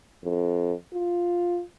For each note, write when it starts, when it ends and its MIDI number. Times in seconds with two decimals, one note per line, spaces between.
0.24 0.73 41
0.93 1.62 65